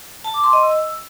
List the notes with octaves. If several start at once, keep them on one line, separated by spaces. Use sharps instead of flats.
A5
D6
C6
D#5
E6